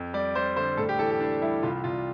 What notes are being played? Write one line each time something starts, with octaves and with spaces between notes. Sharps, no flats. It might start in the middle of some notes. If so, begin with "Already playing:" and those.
Already playing: F2
G3 D5
G3 C5
D3 C5
A2 A4
G4
E3 A4
G4
E3 D4
G3 E4
C2 F4
C2 F4